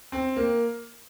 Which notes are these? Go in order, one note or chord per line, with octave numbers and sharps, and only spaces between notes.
C4
A#3